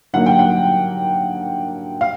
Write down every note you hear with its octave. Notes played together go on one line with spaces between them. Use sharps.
D3 F#3 A#3 D#4 F#5
G5
F#5
F5